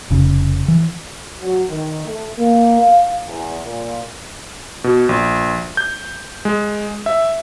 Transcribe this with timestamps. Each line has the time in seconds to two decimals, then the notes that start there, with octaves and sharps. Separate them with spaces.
0.10 F1 C#3
0.68 E3
1.41 F#3
1.70 D#3
2.05 A3
2.38 A#3
2.80 F5
3.27 E2
3.63 A#2
4.84 B2
5.09 A#1
5.77 G6
6.45 G#3
7.06 E5